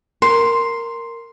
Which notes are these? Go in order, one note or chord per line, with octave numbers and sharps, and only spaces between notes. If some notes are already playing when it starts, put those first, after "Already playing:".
A#4 C6